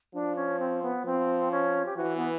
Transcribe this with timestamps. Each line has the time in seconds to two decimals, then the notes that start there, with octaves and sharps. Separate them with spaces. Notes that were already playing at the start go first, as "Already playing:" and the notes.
0.14 F3 D4
0.36 C#4
0.59 C4
0.82 B3
1.05 F3 C4
1.51 C#4
1.86 G4
1.97 E3 F#4
2.17 B3